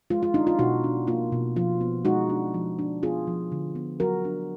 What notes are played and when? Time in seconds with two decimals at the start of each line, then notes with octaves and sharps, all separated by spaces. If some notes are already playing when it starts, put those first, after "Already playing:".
0.10 G#3 F4
0.23 F4
0.34 D4 D#4
0.47 F4
0.59 B2 D#4 F#4
0.84 D4
1.07 A#3 F4
1.32 B2
1.56 F3 F4
1.81 B3
2.05 G#3 D#4 F#4
2.30 D4
2.54 F3
2.79 D4
3.03 B3 F4 G#4
3.27 F3
3.52 D3
3.75 B3
4.00 F#3 F#4 A#4
4.25 D4